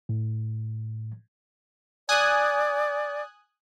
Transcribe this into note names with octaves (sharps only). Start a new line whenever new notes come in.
A2
D5 G#5 D#6 F#6